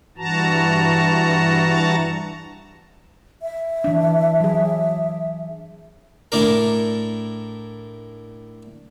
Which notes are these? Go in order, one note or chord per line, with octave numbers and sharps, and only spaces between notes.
G2 E3 F#4 A5 A#5
E5
E3 D4
F#3 G#4
A2 A3 D4 A#4